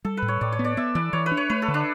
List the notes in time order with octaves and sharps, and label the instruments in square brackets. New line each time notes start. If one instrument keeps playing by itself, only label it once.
[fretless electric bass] G3 [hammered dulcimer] A4
[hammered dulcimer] B4
[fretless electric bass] A2
[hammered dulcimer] C#5
[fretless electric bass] A2 [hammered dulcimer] D5
[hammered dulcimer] C#5
[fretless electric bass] B3
[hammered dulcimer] D5
[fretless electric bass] B3 [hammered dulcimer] E5
[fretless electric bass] E3 [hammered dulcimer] D5
[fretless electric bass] E3 [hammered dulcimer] C#5
[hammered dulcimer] B4
[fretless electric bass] D4
[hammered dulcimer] C#5
[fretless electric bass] A3 [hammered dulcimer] B4
[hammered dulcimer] A4
[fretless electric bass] D3
[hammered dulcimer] D4